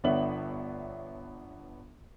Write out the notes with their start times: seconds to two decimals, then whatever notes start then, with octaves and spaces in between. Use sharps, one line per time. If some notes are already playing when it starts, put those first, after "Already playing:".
0.04 G1 B3 D4 C#5 E5 F#7